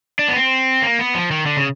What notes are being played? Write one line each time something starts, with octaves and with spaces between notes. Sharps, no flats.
D4
B3
C4
A#3
B3
F3
D#3
D3
C#3